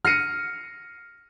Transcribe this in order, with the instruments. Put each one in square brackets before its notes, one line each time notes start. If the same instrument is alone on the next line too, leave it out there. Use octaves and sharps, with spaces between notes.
[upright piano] F6 A#6 C7 C#7 D#7